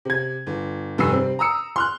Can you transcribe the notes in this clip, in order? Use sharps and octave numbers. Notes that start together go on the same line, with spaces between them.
C3 G#6
G1
F1 G2 G#5 E6 C7
C3 G3 C4
A#5 D#6 E6 C#7
C6 F6 F#6